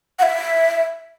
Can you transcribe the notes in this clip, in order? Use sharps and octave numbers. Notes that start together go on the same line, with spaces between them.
F#5
E5